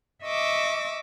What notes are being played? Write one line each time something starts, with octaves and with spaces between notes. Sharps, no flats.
D#5 E5 C#6 D6 E6